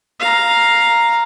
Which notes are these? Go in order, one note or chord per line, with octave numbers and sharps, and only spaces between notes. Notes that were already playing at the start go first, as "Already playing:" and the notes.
F5 A#5